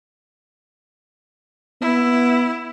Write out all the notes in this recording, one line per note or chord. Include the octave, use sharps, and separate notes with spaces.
B3 E4